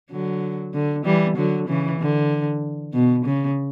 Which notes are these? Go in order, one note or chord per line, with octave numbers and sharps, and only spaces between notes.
D3 F#3
D3
E3 G3
D3 F#3
C#3 E3
D3
B2
C#3